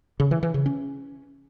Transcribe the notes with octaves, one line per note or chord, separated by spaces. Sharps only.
C#3
E3
E3
C#3
C#4